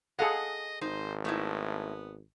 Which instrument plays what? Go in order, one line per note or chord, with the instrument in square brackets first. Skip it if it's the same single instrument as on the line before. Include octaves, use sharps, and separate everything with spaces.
[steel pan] G#4 A4 F#5 [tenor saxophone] D#5 [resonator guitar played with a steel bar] F5
[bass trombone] G#1 [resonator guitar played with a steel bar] D#4 [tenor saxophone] C5
[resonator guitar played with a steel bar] A3 D#4 E4 [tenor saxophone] B3